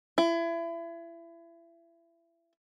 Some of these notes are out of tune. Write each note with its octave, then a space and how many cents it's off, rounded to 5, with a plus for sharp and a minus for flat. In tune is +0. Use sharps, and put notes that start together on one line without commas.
E4 +30